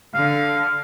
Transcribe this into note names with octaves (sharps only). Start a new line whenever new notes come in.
D3 F5